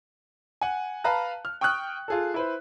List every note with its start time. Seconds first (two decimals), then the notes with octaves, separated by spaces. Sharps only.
0.61 F#5 G#5
1.04 B4 F5 A5 A#5 F#6
1.45 F6
1.61 G5 C#6 D#6 F6 F#6
2.08 F4 G#4 A4
2.34 E4 B4 C5